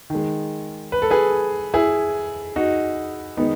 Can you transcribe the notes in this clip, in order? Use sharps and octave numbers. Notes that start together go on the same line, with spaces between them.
D#3
G#3
B4
A4
G#4 B4
E4 G#4
D#4 F#4
D#3 G#3 B3 D#4